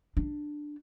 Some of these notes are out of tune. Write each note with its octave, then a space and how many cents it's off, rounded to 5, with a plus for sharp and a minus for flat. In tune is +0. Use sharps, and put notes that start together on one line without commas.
D4 +10